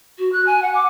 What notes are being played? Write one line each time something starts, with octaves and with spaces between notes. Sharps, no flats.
F#4
F#6
G#5
F#5
D6